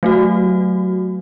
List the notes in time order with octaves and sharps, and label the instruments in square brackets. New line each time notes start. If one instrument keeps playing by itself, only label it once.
[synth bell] F#3 A3 F#4